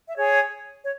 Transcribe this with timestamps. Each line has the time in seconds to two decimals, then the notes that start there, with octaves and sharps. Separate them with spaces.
0.09 E5
0.17 G#4 C#5
0.83 C#5